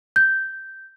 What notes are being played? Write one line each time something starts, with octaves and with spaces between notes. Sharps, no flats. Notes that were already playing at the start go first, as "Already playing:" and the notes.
G6